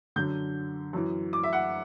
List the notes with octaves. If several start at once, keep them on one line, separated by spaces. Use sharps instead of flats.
F#2 D3 G6
F#2 E3
D6
E5
F#5